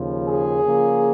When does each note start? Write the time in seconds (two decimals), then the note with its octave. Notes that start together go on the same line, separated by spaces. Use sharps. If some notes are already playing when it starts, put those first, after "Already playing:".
Already playing: D#2 C#3 F3
0.24 G#4
0.64 C#3 F3 A#3